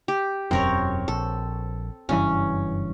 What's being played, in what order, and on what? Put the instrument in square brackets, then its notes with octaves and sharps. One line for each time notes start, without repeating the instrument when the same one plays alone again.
[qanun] G4
[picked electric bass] E1 F#2 [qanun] C4 A#4 C#5
[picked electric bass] A#1 [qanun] A4
[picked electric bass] F#1 G2 E3 [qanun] C#4